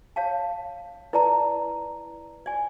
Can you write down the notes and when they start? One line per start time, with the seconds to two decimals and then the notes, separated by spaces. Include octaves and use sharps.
0.16 C#5 F5 A5
1.13 E4 B4 D5 A5 A#5
2.46 D5 G#5